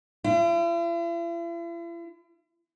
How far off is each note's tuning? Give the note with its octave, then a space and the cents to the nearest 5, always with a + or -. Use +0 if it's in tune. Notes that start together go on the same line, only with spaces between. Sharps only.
E4 +45